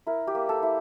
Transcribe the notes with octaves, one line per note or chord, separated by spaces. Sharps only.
E4 A#4
G4
A#3
A4
E4